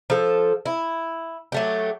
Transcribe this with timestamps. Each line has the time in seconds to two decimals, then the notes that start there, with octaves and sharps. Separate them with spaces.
0.10 F3 A4
0.66 E4
1.52 F#3 A3 G4